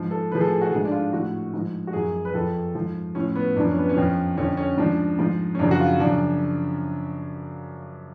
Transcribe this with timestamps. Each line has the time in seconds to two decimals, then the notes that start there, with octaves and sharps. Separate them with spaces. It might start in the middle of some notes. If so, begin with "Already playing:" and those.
Already playing: G#2 F3
0.11 A4
0.31 A2 B4
0.35 F3 G#4
0.41 A4
0.52 G#4
0.61 F#4
0.71 F3 G#4
0.76 G#2
0.85 D4
0.92 F4
1.12 A2 F3 F#4
1.54 G#2 F3
1.87 F#4
1.93 F#2 F3 G#4
2.25 B4
2.34 F2 F3 A4
2.75 G#2 F3
3.15 A2 F3 C#4
3.35 B3
3.56 F#2 F3 D4
3.67 C#4
3.79 B3
3.89 C#4
3.96 F2 F3
4.37 F2 D3 F3 C#4
4.57 C#4
4.78 G#2 F3 D4
5.19 G#2 F3
5.55 C#4
5.59 F#2 C#3 F3 D4
5.71 F#4
5.80 F4
6.00 F#2 C#3 F3 D4